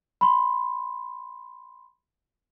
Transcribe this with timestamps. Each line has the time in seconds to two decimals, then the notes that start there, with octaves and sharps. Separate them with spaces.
0.21 B5 C6